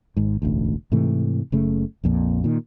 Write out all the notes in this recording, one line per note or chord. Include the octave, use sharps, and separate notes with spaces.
G#1 G#2
E1 A1 D2
G#2 C3 E3 A3
F#1 C#3 A3
A#1 F2 A#2
A#2 D#3